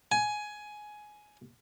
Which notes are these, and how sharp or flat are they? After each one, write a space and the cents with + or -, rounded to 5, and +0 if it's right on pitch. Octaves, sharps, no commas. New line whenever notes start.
G#5 +15